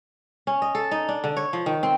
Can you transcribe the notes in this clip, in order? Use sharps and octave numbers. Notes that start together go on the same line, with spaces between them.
C#4
D#5
A4
D#4
D4
D3
C#5
F3
D#3
C4